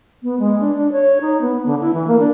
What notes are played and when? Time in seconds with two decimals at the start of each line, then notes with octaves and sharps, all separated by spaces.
0.23 B3
0.39 G#3
0.60 D4
0.76 D4
0.92 C#5
1.21 D#4
1.41 B3
1.66 D3
1.80 E4
1.93 E3
2.07 A#3
2.19 D4